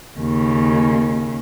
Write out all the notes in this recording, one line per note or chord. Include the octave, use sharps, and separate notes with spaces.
D#2 C#3